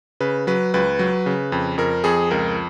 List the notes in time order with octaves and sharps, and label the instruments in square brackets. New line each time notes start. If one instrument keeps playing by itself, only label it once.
[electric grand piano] C#3 B4
F#3 B4
C#2 B4
F#3
C#3
F2
F2 A#4
F2 G#4
C#2 A#4